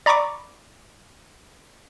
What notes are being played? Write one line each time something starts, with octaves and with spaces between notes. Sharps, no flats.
D5 A#5 B5 C#6 D6